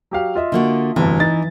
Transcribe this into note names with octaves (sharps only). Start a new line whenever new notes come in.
F#3 G4 F5
F4 D#5 E5
D3 A#3 F#4
F1 D2 G2 E3
D#4 A6